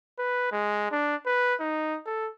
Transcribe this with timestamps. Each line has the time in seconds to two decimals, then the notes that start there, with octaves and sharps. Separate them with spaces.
0.19 B4
0.51 G#3
0.91 D4
1.26 B4
1.60 D#4
2.06 A4